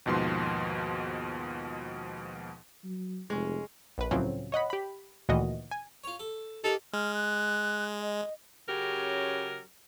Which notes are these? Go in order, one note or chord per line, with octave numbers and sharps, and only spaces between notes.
D#2 G#2 B2 F3 C6
F#3
F1 G#3 C#4
A#1 B4
C#2 A2 F3 F#3 C4 C#4
C#5 D#5 F#5 B5
G4 B5
D2 A#2 D#3 E3 F#4 D#5
G#5
F4 C#5
A4
D#4 G4 A4 A#4
G#3 F6
F#6
D#5
C#3 F#3 C#4 G4 A#4